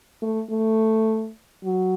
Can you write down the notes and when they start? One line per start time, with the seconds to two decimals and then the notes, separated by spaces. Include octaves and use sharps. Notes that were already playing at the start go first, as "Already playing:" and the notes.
0.22 A3
0.51 A3
1.64 F#3